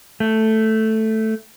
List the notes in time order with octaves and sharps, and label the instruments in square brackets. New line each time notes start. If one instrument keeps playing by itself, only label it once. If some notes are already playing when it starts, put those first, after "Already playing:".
[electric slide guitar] A3